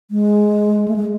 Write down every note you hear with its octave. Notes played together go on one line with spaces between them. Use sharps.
G#3
A3
G#3